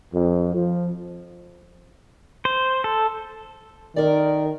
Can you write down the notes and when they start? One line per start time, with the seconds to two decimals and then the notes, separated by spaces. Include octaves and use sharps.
0.13 F2
0.54 F3
2.45 C5
2.84 A4
3.96 D#3 A#4 D5